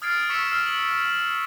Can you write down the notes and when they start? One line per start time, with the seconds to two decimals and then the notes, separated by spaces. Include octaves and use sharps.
0.02 D#6 F6 G#6 A6 C7 D7
0.29 C#6 E6 B6 C#7 E7
0.47 E6 F6 C7
0.66 F#7